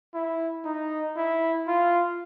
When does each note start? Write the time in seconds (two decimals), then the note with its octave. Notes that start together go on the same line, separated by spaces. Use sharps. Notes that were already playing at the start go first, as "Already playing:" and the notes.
0.14 E4
0.65 D#4
1.16 E4
1.67 F4